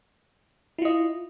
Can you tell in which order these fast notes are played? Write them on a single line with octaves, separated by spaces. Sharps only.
E4 F4 D#5